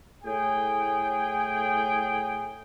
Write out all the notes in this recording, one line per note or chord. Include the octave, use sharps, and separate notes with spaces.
A2 G#4 G5